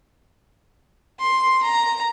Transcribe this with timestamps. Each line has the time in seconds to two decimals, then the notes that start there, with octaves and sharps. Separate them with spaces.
1.20 C6
1.63 A#5